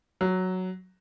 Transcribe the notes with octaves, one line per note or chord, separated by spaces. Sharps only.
F#3